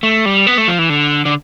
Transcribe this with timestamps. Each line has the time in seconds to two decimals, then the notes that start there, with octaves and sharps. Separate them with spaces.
0.03 A3
0.26 G3
0.47 B3
0.58 A3
0.68 F3
0.79 E3
0.90 D3
1.25 D3